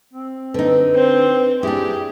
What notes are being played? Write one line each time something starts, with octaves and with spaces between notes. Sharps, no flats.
C4
D3 D#4 B4
C4 C5
D4 E4 G4 G#4